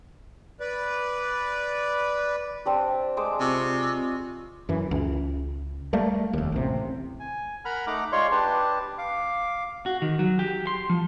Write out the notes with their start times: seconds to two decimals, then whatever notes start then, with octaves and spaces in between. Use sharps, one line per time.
0.60 B4 D5
2.65 C4 D4 G4
3.17 G#3 C5 D6
3.40 C3 F4 C#6
4.69 F#2 E3
4.91 C#2
5.93 G3 A3 A#3
6.33 F1 D#2
6.52 A1 C3
7.20 G#5
7.65 A#4 F#5 A#5 B5 F6
7.87 A3 D#4 F#5 A#5 D6
8.12 G#3 F4 C#5 D5 C6 C#6
8.31 D4 G4 B4 A5
8.98 F5 D6
9.86 F#4
10.02 D#3
10.19 F#3
10.39 G4
10.67 C6
10.90 F3